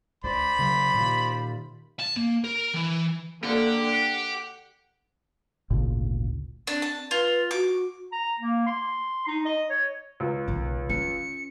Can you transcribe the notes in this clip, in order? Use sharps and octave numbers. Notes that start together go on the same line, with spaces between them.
C#2 C5 D5 B5
C#3 F#3
A#2 D#3
A5
A#3
A#4
E3 E4
D3 A#3 G4 F#5
F#5
G#1 D2 A#2 C#3
C4 D4
A5
F4 B4
F#4 D6
A#5
A#3
C6
D#4
D#5
C#5
C#2
B1 D#3
C#4 C#7